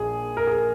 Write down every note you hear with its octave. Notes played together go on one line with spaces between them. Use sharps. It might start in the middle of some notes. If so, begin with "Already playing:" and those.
Already playing: A#1 A#2 G#4
A#4
G#4